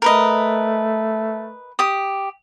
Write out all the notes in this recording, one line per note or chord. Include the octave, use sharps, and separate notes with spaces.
A3 A#4 B4 D#5
G4 D#6